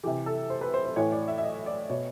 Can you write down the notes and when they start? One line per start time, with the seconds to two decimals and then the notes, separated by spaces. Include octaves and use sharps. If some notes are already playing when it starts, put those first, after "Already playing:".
0.04 C3 E3 G4
0.26 A4
0.50 C5
0.61 B4
0.74 C5
0.85 C5
0.96 A2 E3 C#5
1.12 D5
1.28 E5
1.38 E5
1.43 D#5
1.66 D5
1.90 B2 C#5